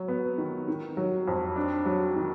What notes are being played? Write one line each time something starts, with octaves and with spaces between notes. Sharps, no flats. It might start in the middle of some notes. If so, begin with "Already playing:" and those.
Already playing: F#3
B3
D#3
D#3
F#3
F2
D4
F#3
D#3